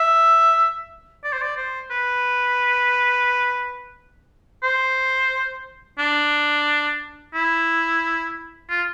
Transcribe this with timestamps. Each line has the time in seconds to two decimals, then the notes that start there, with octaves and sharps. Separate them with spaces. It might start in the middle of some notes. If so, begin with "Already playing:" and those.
Already playing: E5
1.24 D5
1.33 C5
1.42 D5
1.57 C5
1.91 B4
4.63 C5
5.99 D4
7.34 E4
8.70 F4